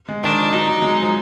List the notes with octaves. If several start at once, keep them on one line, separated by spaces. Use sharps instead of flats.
G#3
D#3 D4
F3
F#3 D#4
F#3
G#3
F3